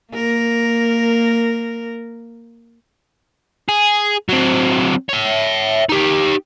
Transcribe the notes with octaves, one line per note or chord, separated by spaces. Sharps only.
A#3 A#4
G#4
F#3 C4
C#5 E5
D#4 G4